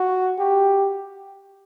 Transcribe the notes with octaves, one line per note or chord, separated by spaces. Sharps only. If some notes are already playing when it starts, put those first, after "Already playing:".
Already playing: F#4
G4